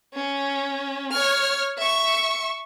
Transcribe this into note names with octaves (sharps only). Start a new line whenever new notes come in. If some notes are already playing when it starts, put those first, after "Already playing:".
C#4
C#5 F6
E5 C#6